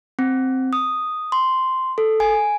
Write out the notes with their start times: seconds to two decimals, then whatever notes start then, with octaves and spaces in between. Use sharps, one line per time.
0.19 C4
0.73 D#6
1.32 C6
1.98 A4
2.20 G#5